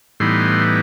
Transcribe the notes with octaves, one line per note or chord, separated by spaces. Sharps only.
A2 E3 G3 B3 D#4 C6